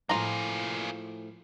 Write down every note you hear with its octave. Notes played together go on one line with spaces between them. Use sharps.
A2 F3 A#3 F4 G#4 A#5